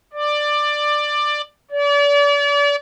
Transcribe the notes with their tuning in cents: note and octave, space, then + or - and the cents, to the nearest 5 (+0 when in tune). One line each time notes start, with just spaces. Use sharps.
D5 +10
D5 -40